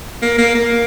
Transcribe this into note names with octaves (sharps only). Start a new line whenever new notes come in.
A#3
A#3
A#3